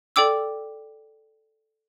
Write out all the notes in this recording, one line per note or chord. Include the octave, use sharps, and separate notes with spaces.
A4 D5 G5 D6 E6